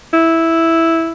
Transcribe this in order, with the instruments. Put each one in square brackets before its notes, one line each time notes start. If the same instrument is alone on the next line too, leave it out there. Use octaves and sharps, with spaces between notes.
[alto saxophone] E4